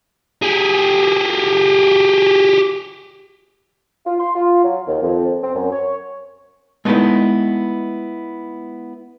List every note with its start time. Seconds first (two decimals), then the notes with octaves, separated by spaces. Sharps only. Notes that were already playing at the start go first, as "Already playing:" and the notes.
0.42 G4 G#4
4.06 F4
4.20 C6
4.35 F4
4.64 F#3
4.87 D#2
5.03 F2
5.44 C4
5.56 F#2
5.72 C#5
6.85 G#3 A3 B3 D#4 E4 B4